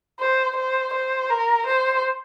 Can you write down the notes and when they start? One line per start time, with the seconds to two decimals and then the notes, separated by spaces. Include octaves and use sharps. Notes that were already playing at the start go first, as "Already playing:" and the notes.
0.20 C5
0.56 C5
0.94 C5
1.30 A#4
1.67 C5